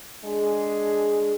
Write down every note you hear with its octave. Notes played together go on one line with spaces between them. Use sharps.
G#3 D4 G#4